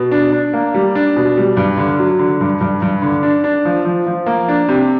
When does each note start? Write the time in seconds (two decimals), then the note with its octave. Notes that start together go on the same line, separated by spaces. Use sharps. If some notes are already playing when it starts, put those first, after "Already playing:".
Already playing: B2
0.11 D4
0.32 D4
0.54 A#3
0.74 G3
0.95 D4
1.16 B2
1.37 G3
1.57 G2
1.77 D3
1.98 F#3
2.19 D3
2.41 G2
2.61 G2
2.82 G2
3.02 D3
3.23 D4
3.44 D4
3.65 F3
3.85 F3
4.06 F3
4.26 A#3
4.48 D4
4.68 C3